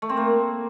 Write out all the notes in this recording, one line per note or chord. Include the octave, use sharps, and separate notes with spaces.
A3
C4
A#3